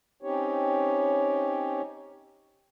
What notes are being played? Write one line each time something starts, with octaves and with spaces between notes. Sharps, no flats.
C4 C#4 D#4 G4 C#5